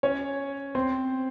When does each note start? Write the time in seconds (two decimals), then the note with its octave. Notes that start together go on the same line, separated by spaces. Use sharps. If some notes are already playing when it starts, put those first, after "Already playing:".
0.03 C#4 C#5
0.75 C4 C5